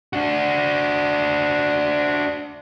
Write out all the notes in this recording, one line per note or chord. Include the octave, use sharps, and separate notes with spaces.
D4 F#4